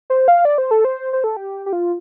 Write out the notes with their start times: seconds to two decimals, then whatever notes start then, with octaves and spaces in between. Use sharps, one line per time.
0.10 C5
0.28 F5
0.45 D5
0.58 C5
0.71 A4
0.85 C5
1.13 C5
1.24 A4
1.37 G4
1.66 G4
1.73 F4